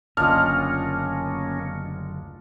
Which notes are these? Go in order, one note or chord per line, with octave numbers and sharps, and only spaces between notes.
F#1 D2 A#3 C#4 D4 F4 D#5 F6